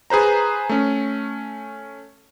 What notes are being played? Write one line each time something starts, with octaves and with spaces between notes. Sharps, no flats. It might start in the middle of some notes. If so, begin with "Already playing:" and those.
G#4 B4 C5 A#5
A3 C#4